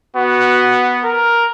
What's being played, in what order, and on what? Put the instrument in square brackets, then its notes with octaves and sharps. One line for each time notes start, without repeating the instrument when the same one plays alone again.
[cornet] B3 [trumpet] F#4
[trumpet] A#4